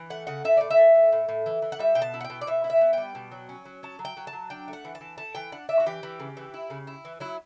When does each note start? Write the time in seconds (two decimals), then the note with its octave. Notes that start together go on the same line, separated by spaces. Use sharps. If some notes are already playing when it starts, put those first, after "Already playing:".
Already playing: E3
0.10 A3 F#5
0.27 C#3 F#5
0.44 A2 E5
0.57 A2 D5
0.70 E5
0.77 A2
0.95 A2
1.12 A2
1.29 A2
1.46 E3
1.62 E3
1.72 F#5
1.79 G3 E5
1.95 B2 G5
2.02 A5
2.14 E4
2.21 F#5
2.25 G5
2.30 B2
2.41 D5
2.47 B2 E5
2.64 E4
2.70 E5
2.81 B3
2.93 G3 G5
3.15 B2
3.31 F#3
3.49 C#4
3.65 F#3
3.83 C#4 A5
3.99 F#3
4.05 G5
4.17 F#3
4.27 A5
4.33 F#3
4.50 D4 G5
4.68 A3
4.73 F#5
4.84 E3
4.95 A5
5.01 E3
5.18 A3 A5
5.35 E3 G5
5.52 D4 F#5
5.69 D4 E5
5.80 F#4
5.86 E3 G4
6.03 E3
6.20 C#3
6.37 E3
6.54 E4
6.70 C#3
6.87 E4
7.05 E3
7.20 F#3 E4